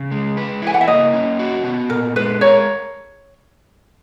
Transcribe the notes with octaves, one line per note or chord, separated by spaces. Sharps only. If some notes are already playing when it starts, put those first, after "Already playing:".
Already playing: C#3
G#3
B4
E4 G#5
F#5
E5
A#3 D#5
C#4
F#4
B3
A#2 A#4
G#3 B4
A#4 C#5